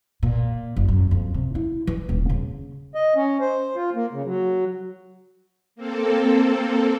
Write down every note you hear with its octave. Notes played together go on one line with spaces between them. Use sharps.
A#2
F#1
F#2
F2
C3
E4
E3
D#1
C#3
D#5
C#4
C5
F4
A#3
C#3
F#3
A#3 C4 A4